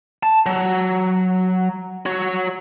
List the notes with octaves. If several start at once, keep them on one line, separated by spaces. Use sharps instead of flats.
A5
F#3
F#4 C#5